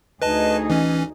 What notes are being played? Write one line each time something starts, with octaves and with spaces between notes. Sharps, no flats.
D2 D#4 G#4 B4 D#5 A5
E3 C#4